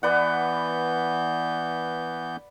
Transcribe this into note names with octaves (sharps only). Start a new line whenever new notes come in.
E3 B3 B4 D5 F#5 G6